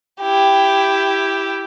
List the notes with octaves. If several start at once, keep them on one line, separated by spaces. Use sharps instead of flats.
E4 G4